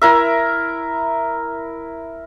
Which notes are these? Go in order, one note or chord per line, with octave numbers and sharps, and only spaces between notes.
E4 A#4 E5